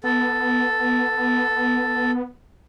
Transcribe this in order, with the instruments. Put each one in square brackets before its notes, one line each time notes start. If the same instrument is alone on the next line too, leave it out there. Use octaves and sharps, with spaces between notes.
[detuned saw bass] B3 [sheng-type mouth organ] A4